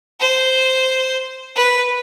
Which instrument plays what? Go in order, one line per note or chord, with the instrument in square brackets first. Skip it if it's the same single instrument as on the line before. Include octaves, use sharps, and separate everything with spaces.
[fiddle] C5
B4